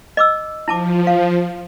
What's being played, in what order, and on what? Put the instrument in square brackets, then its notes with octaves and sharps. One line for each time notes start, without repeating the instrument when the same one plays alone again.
[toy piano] D#5 D6 E6
[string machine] F3 [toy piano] E4 A5 D6
[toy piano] F5